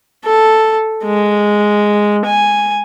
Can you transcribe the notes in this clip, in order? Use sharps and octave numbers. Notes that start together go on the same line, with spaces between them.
A4
G#3
G#5